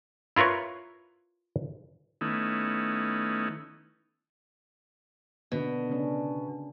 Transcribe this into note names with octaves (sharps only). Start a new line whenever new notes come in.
E4 F4 A#4 B4 C#5
D#3 A3 B3 C#4 D#4 E4
B2 D3 D#3 D4
C#3 C#4 D4